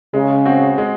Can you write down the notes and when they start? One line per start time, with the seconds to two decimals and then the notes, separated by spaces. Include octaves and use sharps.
0.14 C#3 G#3
0.46 C4 F#4
0.78 G#3